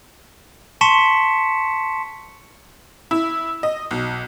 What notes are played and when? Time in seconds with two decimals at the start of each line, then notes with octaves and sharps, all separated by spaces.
0.81 A5 C6 C#6 B6 C#7 E7
3.11 E4
3.63 D#5
3.91 B1